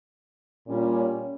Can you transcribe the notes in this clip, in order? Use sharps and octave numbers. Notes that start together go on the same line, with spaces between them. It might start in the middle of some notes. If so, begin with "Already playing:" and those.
A#2 G3 C#4 F4